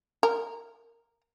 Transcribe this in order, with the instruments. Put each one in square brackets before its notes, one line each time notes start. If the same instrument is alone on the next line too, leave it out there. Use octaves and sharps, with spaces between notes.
[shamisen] A#4